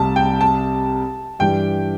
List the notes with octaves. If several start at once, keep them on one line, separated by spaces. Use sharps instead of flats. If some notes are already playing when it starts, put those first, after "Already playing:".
Already playing: C2 C3 G3 A5
G5
A5
G2 E3 G3 D4 G5